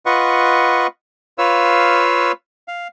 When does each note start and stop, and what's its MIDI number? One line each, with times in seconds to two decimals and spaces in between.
0.06 0.87 65
0.06 0.87 71
0.06 0.87 75
0.06 0.87 78
0.06 0.87 85
1.38 2.32 65
1.38 2.32 71
1.38 2.32 73
1.38 2.32 77
1.38 2.32 88
2.68 2.88 77